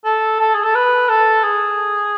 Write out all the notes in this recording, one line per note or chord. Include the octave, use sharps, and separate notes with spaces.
A4
A4
G#4
A4
B4
A4
G#4